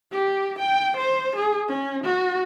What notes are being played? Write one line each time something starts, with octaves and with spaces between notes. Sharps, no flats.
G4
G5
C5
G#4
C#4
F#4